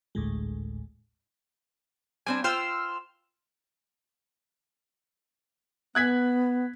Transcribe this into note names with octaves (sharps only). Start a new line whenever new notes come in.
G#1 D2 A2 G#3
G3 C4 D4 G#5
F4 C5 G5 C6 E6 F6
B3 F#6 G#6 B6